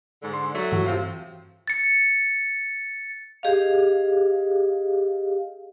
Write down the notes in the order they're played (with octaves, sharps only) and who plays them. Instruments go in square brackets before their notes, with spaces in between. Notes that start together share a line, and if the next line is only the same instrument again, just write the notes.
[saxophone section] G#2 D3
[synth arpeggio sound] C6
[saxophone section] F#3 A3
[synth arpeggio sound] G2 E3 F#4
[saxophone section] C3 F3
[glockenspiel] A6 C#7
[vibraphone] G4 G#4 D#5 F5